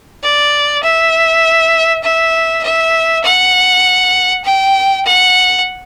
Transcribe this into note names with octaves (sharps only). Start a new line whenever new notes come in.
D5
E5
E5
E5
F#5
G5
F#5